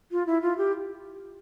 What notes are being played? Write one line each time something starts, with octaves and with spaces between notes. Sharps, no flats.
F4
E4
F4
G4